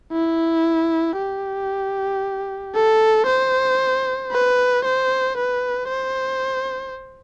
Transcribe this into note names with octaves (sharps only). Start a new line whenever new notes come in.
E4
G4
A4
C5
B4
C5
B4
C5